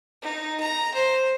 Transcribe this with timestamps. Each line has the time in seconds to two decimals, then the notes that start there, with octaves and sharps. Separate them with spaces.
0.22 D#4
0.60 A#5
0.94 C5